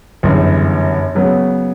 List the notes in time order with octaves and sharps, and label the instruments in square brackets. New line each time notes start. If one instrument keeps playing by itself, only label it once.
[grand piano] G1 F#2 C#3 E3
C#3 F#3 B3